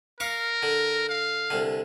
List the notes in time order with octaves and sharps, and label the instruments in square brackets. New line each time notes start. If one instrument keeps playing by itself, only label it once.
[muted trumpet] A#4 [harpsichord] F5 C#6 D6
[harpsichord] D3
[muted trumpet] F5
[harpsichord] C2 D3